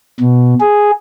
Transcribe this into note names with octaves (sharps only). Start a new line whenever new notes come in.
B2
G#4